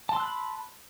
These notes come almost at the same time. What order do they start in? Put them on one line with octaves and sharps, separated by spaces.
A5 C6 E6 F#6 B5